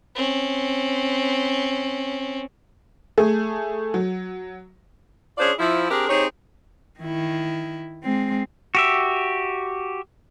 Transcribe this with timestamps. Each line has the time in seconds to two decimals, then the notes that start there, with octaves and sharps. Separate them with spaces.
0.15 C4 C#4
3.18 A3 G#4
3.94 F#3
5.38 C#4 D4 F4 G#4 C5 D5
5.58 F3 E4
5.91 C4 D4 G4 G#4 A#4
6.09 C4 D#4 G4 G#4 C5 C#5
7.00 D#3 E4
8.04 G#3 C4
8.75 F#4 G4 E5